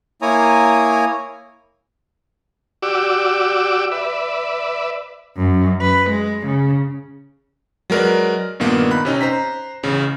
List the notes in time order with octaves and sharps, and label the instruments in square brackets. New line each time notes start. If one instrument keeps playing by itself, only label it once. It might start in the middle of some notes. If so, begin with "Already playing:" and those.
[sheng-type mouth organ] A#3 E4 C#5 G#5 A#5 D#6
[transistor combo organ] F#4 G4 D5 D6 E6
B4 D5 E5
[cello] F#2
B4
G#3
C#3
[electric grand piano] F#3 G#3 A#4 B4 D5
G2 A#2 D#3 A#3 B3
B5 F#6
C3 C#4 D#4
C5 A#5 B6
A1 C#3